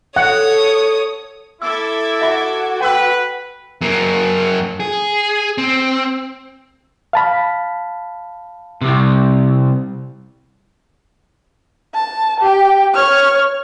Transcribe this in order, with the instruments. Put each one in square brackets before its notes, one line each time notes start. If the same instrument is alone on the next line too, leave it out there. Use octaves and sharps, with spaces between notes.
[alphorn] A4 [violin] C#5 D#6 [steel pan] F#5
[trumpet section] E4 [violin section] A4 D6 G#6 [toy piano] E6
[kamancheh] F#4 [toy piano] E5 B5
[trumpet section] B4 [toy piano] G5 E6
[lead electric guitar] F#2 A#3
G#4
C4
[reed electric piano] F5 A5 B5
[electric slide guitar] C3 G3
[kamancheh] A5
G4 G5
C#5 F6